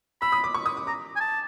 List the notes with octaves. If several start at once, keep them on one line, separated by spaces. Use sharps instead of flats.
B5 E6
D#6
D6
C#6
D#6
D6
A#5 D6
G#5
A5